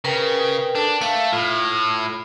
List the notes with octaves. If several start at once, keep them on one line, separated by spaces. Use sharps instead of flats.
C#3 A#4 B4 G5
D4 A4
A3 F5
A2 F4